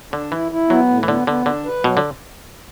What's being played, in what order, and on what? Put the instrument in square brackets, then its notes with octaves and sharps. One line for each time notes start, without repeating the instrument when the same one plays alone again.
[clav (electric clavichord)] D3 [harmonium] D4
[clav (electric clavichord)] E3 [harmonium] E4
[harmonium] E4
[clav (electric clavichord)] F#3 [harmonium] B3
[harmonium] A2
[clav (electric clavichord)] E3
[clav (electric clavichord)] D3 [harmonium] B3
[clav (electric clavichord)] D3 [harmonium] B3
[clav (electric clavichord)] D3 [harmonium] D4
[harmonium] B4
[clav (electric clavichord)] B2 [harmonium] F#3
[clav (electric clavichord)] D3